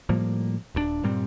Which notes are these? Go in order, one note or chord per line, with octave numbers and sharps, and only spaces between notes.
A2 F3 G3 A#3
D#1 G2 D4
G2 A#2 G3 C4